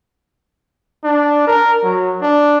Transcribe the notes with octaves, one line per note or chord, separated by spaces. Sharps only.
D4
A#4
F#3
D4